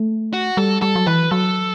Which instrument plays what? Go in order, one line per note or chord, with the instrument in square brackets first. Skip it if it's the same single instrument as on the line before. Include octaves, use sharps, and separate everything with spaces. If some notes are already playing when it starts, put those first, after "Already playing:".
Already playing: [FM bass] A3
[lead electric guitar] F#4
[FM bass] G3 [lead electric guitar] A4
[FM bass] G3 [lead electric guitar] A4
[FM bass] F#3
[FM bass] E3 [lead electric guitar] B4
[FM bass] F#3 [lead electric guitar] A4